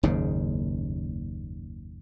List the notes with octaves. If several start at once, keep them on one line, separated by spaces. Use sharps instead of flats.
F#1 D#2 G#2 C#3